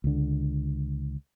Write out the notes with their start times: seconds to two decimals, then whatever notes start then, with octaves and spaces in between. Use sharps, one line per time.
0.04 C#2 D3